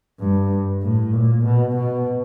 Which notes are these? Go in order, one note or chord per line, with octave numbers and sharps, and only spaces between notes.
G2
A2
A#2
B2
B2